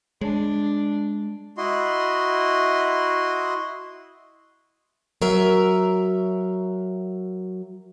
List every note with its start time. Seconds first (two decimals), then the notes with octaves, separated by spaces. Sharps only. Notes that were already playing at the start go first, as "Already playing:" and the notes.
0.21 G#3 D4
1.57 E4 F#4 D#5 C6
5.22 F#3 A#4 E5